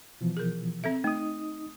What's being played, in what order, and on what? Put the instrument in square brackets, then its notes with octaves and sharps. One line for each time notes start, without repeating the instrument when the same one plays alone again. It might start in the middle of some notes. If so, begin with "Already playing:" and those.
[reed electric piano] B2 E3 F3
[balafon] G#4 A#4
C4 A4 E5
[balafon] A3 [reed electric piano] D#4 D#6